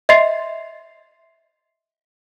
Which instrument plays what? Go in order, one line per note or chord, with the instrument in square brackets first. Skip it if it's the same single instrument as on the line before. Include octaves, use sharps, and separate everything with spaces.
[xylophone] D#5 E5 C6 A6 C7 F7